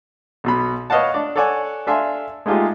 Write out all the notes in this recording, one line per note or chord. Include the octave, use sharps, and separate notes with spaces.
B1 B2 B5
B4 C#5 D#5 F5 F#5 A5
D4 D5
A4 C#5 D5 F#5 G#5
D4 A4 E5 F5 G#5 C6
G#3 A3 D#4 F4 G4 G#4